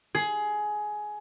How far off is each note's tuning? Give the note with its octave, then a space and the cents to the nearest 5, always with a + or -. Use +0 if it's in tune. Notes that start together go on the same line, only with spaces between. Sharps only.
G#4 +15